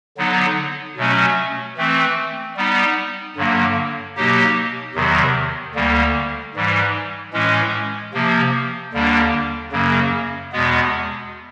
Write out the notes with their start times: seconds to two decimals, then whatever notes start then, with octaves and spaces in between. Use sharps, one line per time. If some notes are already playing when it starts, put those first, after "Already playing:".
0.17 D3 F#3 B3 D#4
0.97 B2 F#3 A3 C#4
1.77 E3 A3 C4
2.57 G3 B3 D#4
3.36 G2 D3 F#3 A#3
4.16 B2 F#3 A#3 D#4 G4
4.95 E2 C3 D#3 F#3
5.74 D2 D3 G3 A#3
6.55 G#2 E3 G3
7.33 A2 E3 G#3 C#4
8.14 C3 F3 A#3
8.93 D#2 D3 G3 A#3 D4
9.72 F#2 C#3 F#3 A#3
10.52 E2 B2 G#3 B3